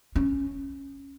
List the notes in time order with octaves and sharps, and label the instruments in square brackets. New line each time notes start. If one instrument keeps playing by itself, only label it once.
[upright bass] C#4